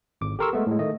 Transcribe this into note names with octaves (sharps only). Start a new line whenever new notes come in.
G#1 D6
G4 A4 A#4 C6 C#6 E6
G#3 A3 B3
A2 G#3
D#3 A3 D#5